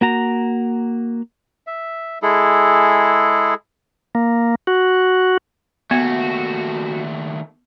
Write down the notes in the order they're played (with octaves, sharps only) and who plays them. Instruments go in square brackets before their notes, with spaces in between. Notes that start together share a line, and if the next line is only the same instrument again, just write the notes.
[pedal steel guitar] A#3 F#4 A#5
[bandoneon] E5
G#3 E4 G#4 A4
[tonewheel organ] A#3
F#4
[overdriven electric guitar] D#2 A3 [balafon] B3 [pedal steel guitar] F#4